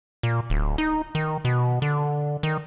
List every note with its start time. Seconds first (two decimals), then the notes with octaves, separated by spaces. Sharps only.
0.23 A#2
0.50 D1
0.78 D#4
1.15 D#3
1.45 B2
1.82 D3
2.43 D#3